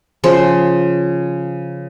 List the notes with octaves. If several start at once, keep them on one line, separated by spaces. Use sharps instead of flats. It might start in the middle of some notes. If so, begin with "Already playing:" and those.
C#3 F3 G#4 C5